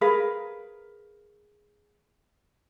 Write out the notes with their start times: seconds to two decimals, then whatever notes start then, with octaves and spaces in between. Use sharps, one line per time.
0.01 G#4 A#4 B4 F5